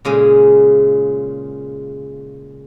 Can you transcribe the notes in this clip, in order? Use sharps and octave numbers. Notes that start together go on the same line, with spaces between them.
A#2 C#3 G#3 G#5